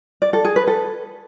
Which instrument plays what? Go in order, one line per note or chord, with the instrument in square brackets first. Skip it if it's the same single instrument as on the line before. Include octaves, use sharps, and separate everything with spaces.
[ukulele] D5
A4
G#4
B4
A4